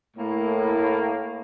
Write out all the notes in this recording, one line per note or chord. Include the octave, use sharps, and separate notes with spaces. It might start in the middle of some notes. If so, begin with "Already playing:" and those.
A2 A#3